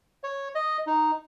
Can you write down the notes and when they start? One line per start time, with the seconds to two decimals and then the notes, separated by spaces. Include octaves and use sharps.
0.24 C#5
0.55 D#5
0.87 D#4